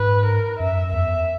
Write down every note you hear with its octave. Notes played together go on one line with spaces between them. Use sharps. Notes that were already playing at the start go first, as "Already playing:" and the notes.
Already playing: G#2 B4
A#4
F#2 E5
E2 E5